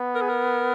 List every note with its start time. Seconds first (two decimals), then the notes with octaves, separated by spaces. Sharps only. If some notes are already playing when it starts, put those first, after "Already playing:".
Already playing: B3
0.15 A#4
0.21 G#4
0.29 A#4